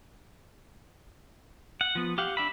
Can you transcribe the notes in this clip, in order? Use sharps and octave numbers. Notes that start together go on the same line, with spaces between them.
F#5
F3 B3
G4 F5 F#5
D4 E5 B5